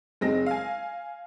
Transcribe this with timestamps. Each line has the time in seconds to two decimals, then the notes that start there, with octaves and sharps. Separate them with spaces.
0.21 F#1 G#3 C4 D#4 A#6
0.46 F5 G#5